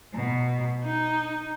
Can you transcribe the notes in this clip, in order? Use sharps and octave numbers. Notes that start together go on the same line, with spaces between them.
B2
D#4